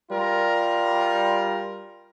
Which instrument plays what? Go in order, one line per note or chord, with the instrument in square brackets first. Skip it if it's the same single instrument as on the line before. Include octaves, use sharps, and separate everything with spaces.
[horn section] G3 F4 A#4